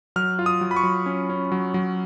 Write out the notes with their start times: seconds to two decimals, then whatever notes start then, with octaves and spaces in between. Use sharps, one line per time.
0.16 F#3 F6
0.39 F4
0.46 D#6
0.61 F#3
0.71 B5
0.76 C#6
0.83 F#3
1.06 C#4
1.30 C#4
1.52 F#3
1.74 F#3